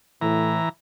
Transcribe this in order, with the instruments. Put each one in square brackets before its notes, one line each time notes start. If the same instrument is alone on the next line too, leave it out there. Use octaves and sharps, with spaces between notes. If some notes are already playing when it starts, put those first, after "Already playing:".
[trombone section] A2 [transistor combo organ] E3 A#5